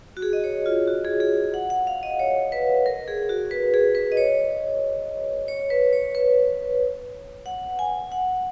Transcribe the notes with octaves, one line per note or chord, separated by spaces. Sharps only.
F#4
G#4
D#5
C#5
F4
F#4
G#4
G#4
F#5
F#5
F5
D#5
C#5
B4
A#4
G#4
F#4
B4
G#4
B4
D#5
C#5
C#5
B4
C#5
B4
F#5
G#5
F#5